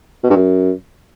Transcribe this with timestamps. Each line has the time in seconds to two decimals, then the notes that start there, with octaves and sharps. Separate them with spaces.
0.23 B2
0.30 G2
0.36 F#2